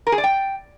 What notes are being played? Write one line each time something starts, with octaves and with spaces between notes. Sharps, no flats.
A#4
G#4
D5
G5